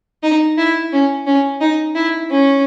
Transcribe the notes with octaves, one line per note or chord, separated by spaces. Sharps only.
D#4
E4
C#4
C#4
D#4
E4
C#4